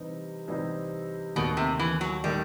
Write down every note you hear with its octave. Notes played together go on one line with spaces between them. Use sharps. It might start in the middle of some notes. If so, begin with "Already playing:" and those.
Already playing: C3 E3 G3 C4 D#4
C3 E3 G3 C4 D#4
D#2 B2 D#3 A3
C3
E3
F#3
D#3 G3 A3